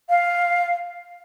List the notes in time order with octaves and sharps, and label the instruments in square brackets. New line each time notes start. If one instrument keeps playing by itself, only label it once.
[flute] F5